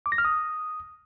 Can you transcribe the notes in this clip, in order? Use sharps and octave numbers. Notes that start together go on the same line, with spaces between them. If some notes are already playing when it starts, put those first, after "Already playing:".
D6
A#6
F6
D#6